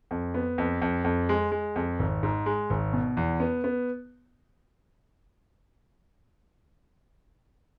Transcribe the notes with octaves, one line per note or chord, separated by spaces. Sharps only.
F2
B3
F2
F2
F2
G#3
G#3
F2
G#1
G#2
G#3
G#1
B2
E2
B3
B3